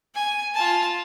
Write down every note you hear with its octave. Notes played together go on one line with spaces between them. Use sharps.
G#5
F4 A5